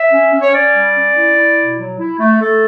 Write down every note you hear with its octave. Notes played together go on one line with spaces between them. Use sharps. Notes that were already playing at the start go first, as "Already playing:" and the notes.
Already playing: E5
C#4
C#4
C#5
C#4 D5
G3
C#4
E4
E4
B2
F#3
E4
A3
A3 A4